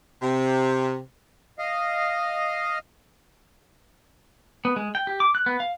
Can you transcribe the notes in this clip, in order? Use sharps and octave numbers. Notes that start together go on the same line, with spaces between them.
C3
D#5 F5
B3
G#3
G5
G4
D6
F#6
B3
F5